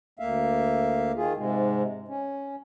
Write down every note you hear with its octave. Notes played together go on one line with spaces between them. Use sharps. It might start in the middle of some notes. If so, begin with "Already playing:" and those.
D2 A#3 E5 F5
D#3 F4 G#4
G#2 C3 G#3
C#4